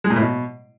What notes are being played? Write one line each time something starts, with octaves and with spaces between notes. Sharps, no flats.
G#3
A#2
A2
B2